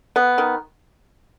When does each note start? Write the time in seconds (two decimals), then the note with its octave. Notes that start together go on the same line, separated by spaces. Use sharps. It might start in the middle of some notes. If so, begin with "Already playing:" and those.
0.16 B3
0.38 D#3